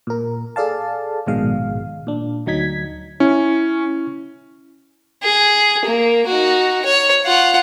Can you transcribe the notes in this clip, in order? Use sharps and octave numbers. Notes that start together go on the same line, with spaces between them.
A#2 A#4
G#4 A4 D5 F5 A5
A#1 G#2 B2 D#3 G#3 F5
A#2 D4
D2 F#3 D#4 G#6 B6
C#4 E4
G#4
A#3
D#4 F#4
C#5
F4 F#5